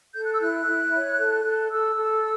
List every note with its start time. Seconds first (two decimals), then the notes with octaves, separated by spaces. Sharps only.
0.14 A4 G6
0.23 F#6
0.33 E6
0.40 E4 F#6
0.66 E4
0.93 C#5
1.18 A4
1.44 A4
1.71 A4 E6
1.97 A4